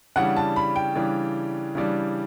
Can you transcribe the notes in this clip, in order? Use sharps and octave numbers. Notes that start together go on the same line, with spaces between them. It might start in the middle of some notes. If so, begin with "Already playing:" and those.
C#3 E3 G3 D4 F#5
A5
B5
G5
C#3 E3 G3 D4
C#3 E3 G3 D4